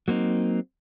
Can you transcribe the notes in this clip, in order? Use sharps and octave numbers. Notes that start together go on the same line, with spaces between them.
F#3 A#3 C4 D#4